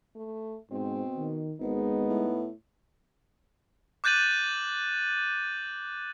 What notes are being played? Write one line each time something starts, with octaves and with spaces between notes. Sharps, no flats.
A3
G#2 B2 C4
D#3
G#1 G#3 B3 D#4
A2
D6 F#6 G6 A6 D#7 F#7